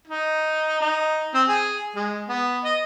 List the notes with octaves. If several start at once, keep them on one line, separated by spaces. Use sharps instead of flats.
D#4
D#4
C4
G#4
G#3
B3
D#5